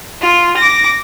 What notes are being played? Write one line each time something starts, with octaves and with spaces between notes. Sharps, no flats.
F4
D6 A#6